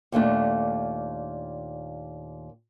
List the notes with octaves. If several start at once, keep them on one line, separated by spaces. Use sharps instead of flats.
D#2 A#2 A3 D4